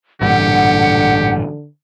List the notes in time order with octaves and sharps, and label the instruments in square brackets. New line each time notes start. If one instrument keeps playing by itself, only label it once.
[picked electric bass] A1 G2 A#2 [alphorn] D3 [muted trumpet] G4 [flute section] F#5